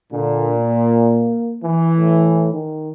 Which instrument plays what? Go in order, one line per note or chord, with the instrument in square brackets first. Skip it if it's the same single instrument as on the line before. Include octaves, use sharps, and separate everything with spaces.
[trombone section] A#2 [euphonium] D3
[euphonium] A#3
[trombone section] E3
[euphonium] A2
D#3